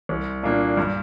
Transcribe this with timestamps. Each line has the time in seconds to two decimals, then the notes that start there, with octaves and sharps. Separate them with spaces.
0.09 C2
0.43 A#2 A#3 D4
0.77 G2